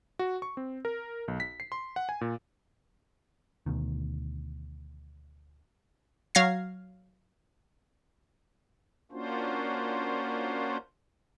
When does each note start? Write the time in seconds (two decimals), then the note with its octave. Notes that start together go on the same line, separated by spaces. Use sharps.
0.19 F#4
0.42 C#6
0.57 C4
0.85 A#4
1.28 B1
1.40 B6
1.60 C7
1.72 C6
1.96 F#5
2.09 G#5
2.21 A#2
3.66 D2 B2 D#3
6.35 F#3 F5 G#6 A#6 C7
9.12 A#3 C#4 D4 F4 F#4 C5